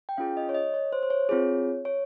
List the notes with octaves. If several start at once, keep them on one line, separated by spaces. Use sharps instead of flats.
G5
C#4 F4 G#4 F5
D#5
C#5
D#5
C#5
C5
C5
C#5
C4 F4 G#4
C#5